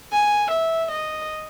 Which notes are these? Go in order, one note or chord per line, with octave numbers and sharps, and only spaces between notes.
G#5
E5
D#5